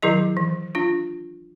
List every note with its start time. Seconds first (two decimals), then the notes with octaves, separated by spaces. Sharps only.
0.02 D#3 F#3 E4 G#4 D#5
0.37 E3
0.75 D4 F4